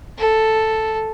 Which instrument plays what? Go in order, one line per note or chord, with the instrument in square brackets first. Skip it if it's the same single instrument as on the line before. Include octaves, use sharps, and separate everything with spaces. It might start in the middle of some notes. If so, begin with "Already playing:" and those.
[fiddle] A4